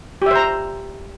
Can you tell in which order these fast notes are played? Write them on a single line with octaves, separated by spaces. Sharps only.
G4 E5 C5 A#5